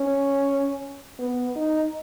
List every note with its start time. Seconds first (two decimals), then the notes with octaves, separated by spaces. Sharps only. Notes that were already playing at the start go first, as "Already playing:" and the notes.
Already playing: C#4
1.19 B3
1.56 D#4